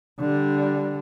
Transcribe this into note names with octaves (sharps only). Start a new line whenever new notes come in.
D3 G3